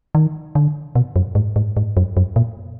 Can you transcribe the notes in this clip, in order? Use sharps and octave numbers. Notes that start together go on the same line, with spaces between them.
D#3
D3
B2
F#2
G#2
G#2
G#2
F#2
F#2
A#2